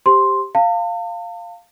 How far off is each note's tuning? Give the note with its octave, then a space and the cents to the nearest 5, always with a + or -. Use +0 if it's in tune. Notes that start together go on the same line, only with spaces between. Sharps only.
G4 +0 C5 +0 C6 +0
F5 +0 A5 +40